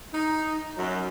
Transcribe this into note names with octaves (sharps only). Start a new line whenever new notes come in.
D#4
F#2